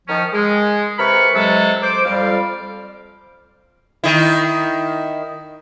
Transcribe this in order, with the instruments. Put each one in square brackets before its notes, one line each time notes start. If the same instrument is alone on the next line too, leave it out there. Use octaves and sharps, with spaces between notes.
[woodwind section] D#3 F3 C#4
G#3
C3 A#4 B4 B5 C#6 F6
C3 E3 F#3 G#3 A4
C5 D6
F2 G3 F5
[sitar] D#3 E4